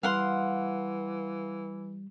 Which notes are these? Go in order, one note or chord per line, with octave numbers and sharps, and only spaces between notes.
E3 G3 F5 F#5 C6